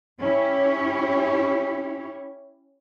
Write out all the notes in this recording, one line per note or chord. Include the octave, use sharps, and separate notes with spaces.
C#4 E4 G4 C#5